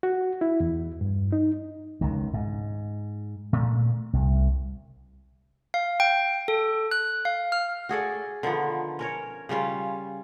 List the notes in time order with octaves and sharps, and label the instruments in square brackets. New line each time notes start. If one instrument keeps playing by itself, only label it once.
[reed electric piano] F#4
E4
E2
G2
D#4
[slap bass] C#2 D#3
G#2
A#2 A3
C2
[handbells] F5
G5
A4
F#6
F5
F6
[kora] F#4 G#4 A4 D5
D3 D#3 F3 B3
C#4 A#4 C#5
C#3 G3 C#4 F4